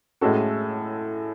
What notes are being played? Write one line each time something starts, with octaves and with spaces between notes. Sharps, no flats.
A2 G#3 C#4 F#4 A4